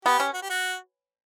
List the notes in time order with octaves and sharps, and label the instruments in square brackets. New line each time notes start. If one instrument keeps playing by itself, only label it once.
[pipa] B3 [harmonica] G4
[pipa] C#4
[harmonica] F#4
G4
F#4